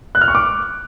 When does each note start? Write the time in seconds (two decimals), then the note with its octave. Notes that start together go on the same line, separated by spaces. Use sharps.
0.15 F#6
0.21 F6
0.28 C#6
0.35 D6